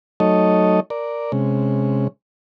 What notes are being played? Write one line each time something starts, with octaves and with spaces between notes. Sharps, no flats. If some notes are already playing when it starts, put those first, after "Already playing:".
F#3 A3 D#4 A4 C#5 D#5
A#4 D5
C3 G#3 C#4